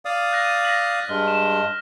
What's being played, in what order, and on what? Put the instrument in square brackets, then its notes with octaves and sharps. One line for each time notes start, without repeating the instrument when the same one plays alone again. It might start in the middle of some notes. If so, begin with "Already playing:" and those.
[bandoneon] D5 F5 D#6
[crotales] F#6 A#6 D#7
A#6 B6 F#7
[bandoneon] G2 G#3 [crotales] F6
[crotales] E7